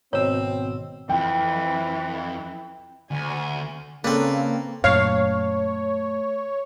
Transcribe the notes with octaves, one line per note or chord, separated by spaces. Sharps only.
G#1 B2 C4 C#5 E6
F2 E3 G5
D2 G#5
C#3 A#3 C4 D4 A4 B4
F#2 A#2 A3 C#5 F5